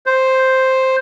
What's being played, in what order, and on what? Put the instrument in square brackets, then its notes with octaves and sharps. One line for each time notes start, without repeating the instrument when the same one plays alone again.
[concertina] C5